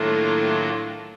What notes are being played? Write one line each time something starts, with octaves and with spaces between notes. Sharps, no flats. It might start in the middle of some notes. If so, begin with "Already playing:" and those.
Already playing: A2 D#3 F#3 A3 A#3 D4 F4